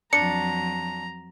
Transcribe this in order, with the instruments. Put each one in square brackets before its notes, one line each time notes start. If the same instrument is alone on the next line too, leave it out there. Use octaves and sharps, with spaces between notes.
[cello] F2 F#3 [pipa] D4 [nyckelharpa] A#5 [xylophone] C#7